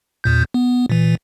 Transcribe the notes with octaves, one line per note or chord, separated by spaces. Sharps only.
E2 A#2 G6
B3
A#2 E3